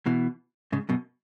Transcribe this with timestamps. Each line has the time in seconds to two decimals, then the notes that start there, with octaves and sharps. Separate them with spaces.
0.06 B2 E3
0.72 G#2 C#3
0.89 F#2 B2